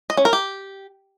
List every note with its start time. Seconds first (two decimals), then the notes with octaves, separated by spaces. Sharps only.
0.10 D#5
0.17 C#4
0.25 A#4
0.33 G4